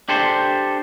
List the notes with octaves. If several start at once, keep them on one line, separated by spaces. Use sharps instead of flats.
D4 G4 A4 C5